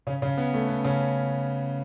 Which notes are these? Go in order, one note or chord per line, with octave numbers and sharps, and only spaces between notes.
C#3 C#4
C#3 C#4
B3
A3
B3
C#3 C#4